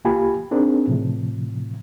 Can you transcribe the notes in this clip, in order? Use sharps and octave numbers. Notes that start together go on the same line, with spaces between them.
C2 A#3 F4 G4 G#5 B5
C4 D4 D#4 G#4 A#4
A2 C3 F3